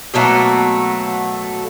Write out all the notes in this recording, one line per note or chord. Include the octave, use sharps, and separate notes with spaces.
B2 F#3 A3 A#3